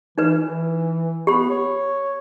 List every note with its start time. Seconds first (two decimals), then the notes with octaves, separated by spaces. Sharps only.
0.18 E3 D#4 B4
0.42 E3
1.27 B3 G4 B5
1.50 C#5